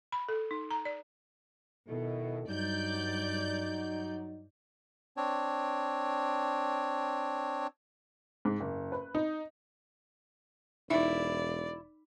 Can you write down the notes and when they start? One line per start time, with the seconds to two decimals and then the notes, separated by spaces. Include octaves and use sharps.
0.12 B5
0.29 A4
0.51 D#4
0.71 A#5
0.85 D5
1.89 B2 D#3 E4 A4
2.48 G2 F#3 D#4 D5 G6
5.17 C4 D4 C#5
8.45 G#2
8.60 F#1
8.92 B4
9.15 D#4
10.90 E1 D#4 E4 D5